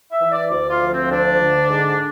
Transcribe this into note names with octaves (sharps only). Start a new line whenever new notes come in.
E5
E3
D5
D2 D5
F4
F3
C4
D2 D4
D3
G#2